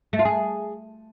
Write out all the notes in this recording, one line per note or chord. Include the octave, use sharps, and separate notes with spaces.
A3
F4
G#4